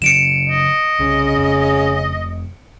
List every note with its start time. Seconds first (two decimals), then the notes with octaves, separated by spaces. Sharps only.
0.02 C#3 F#3 C#7 D7 E7
0.49 D#5
1.00 C2 C#3
1.37 F1